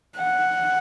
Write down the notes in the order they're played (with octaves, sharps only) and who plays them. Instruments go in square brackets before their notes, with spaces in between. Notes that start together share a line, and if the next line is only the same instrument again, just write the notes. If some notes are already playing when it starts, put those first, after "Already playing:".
[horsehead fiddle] F#5